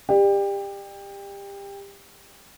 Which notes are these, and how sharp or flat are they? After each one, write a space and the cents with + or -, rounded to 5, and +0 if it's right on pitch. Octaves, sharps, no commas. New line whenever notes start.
G4 +25 D5 +30